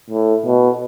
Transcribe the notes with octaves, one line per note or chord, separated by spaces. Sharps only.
A2
B2